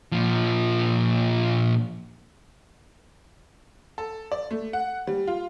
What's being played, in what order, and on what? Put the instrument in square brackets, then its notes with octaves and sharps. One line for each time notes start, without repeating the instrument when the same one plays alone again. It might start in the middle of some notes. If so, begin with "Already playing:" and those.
[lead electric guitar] A#2 F3
[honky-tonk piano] A4
D5
A3
F#5
G3
F4